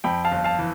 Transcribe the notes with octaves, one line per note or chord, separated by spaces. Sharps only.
F2 G5 B5
F5 A5
G1
F5 A5
E3